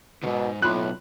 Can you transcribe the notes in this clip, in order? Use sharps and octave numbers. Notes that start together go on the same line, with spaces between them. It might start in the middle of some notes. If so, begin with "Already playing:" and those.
D2 G#2 B2
B1 A2 F4 B5 C6 F#6